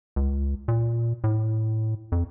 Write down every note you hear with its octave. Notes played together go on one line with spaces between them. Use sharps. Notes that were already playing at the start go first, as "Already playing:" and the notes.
C#2
A#2
A2
F2